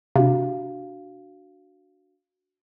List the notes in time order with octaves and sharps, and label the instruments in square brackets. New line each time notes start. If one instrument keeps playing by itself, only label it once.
[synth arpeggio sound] C3 [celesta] D4 F#4 F5